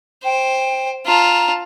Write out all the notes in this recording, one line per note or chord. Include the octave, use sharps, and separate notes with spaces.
C5 G5
F4 A5 A#5